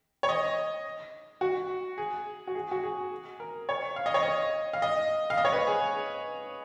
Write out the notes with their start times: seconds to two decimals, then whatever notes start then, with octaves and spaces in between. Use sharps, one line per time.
0.23 C#5
0.29 D#5
1.41 F#4
1.98 G#4
2.47 F#4
2.55 G#4
2.71 F#4
2.83 G#4
3.40 A#4
3.69 C#5
3.96 F5
4.06 D#5
4.14 C#5
4.23 D#5
4.73 F5
4.82 D#5
5.30 F5
5.37 D#5
5.45 C#5
5.52 B4
5.67 G#4